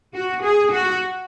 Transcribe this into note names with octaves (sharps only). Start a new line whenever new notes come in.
F#4
G#4
F#4